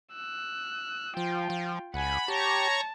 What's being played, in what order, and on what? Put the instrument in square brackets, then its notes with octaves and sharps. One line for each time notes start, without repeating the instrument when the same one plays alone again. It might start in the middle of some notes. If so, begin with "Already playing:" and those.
[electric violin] E6 F#6
[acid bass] F3 [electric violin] F4 G5
[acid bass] F3
[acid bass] C#2 [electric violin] F#5 G#5 [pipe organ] B5
[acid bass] G4 [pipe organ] C#5 A#5 C#6 [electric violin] A5